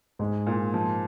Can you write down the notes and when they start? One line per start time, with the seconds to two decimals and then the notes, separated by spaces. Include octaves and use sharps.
0.19 G#2 G#3
0.47 A#2
0.74 F3